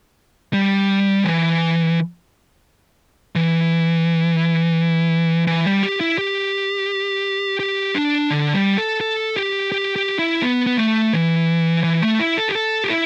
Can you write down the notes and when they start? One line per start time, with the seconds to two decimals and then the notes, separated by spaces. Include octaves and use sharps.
0.53 G3
1.24 E3
3.35 E3
5.47 E3
5.66 G3
5.83 G4
6.01 E4
6.18 G4
7.60 G4
7.95 D4
8.30 D3
8.54 G3
8.78 A4
9.01 A4
9.36 G4
9.72 G4
9.96 G4
10.19 E4
10.42 B3
10.66 B3
10.77 A3
11.13 E3
11.84 E3
12.02 A3
12.20 E4
12.38 A4
12.49 G4
12.55 A4
12.84 G4
12.90 E4